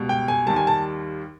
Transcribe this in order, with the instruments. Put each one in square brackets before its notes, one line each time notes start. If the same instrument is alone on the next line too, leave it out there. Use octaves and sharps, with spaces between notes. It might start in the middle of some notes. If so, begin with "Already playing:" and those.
Already playing: [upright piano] C#2 B2 G3
G5
G#5
D#2 D#3 G3 A5
G#5
A5